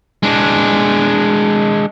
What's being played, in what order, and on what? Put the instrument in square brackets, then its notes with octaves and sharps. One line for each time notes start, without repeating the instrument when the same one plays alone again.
[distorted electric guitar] G#3 D4